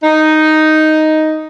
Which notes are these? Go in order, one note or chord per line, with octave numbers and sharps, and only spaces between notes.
D#4